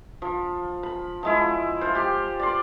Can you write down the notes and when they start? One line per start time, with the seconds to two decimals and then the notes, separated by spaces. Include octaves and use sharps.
0.22 F3
0.83 B5
1.23 F3 G#3 E4
1.81 F4 C5
1.95 G4 C6
2.40 D5 C6